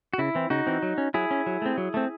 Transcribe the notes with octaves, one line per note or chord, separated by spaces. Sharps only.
F#4
C#3 E4
E3 C4
C#3 D#4 F#4
E3 C4
F#3
C#4
F#3 E4 G#4
C#4
F#3
A3 C4
F#3
A3 C4